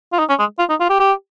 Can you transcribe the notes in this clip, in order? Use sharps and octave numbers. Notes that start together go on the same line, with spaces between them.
F4
D#4
C#4
G#3
F4
D#4
F4
G4
G4